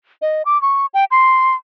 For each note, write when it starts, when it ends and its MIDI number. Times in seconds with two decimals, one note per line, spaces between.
0.22 0.43 75
0.45 0.60 86
0.62 0.86 85
0.94 1.05 79
1.11 1.55 84